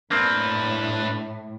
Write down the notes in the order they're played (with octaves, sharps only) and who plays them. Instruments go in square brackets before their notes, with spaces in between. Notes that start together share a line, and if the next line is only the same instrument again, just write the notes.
[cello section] A2 [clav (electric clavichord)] A#3 C4 [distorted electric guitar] D4 B4